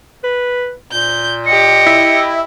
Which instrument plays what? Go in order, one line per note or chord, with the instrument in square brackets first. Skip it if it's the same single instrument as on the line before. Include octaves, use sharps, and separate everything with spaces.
[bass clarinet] B4
[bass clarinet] A#2 [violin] G6
[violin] G4 D#5 [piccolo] C#7
[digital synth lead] E4